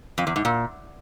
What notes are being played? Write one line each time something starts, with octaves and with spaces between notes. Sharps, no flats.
F2
E2
G#2
A#2